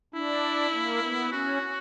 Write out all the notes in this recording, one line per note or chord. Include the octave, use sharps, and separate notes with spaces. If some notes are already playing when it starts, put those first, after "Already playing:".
D4 E4
A#3
B3
C#4 F#4